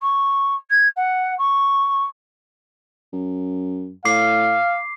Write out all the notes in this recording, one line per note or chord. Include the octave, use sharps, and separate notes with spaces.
C#6
G#6
F#5
C#6
F#2
A2 F5 D6 C7